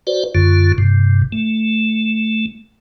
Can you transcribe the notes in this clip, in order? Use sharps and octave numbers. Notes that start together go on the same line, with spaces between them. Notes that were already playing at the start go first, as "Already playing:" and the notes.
F#4 B4 C5 D5
F#2 D3 F4
G2 C3
A3